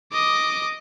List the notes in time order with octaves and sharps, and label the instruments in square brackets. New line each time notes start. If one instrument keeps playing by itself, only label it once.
[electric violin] D#5 D6